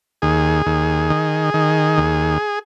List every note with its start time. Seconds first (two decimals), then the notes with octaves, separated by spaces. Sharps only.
0.22 D#2 G#4
0.66 D#2
1.10 D#3
1.54 D#3
1.97 D#2